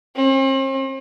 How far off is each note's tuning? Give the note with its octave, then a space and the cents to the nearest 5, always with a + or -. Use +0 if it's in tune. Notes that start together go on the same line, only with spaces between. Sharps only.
C4 +45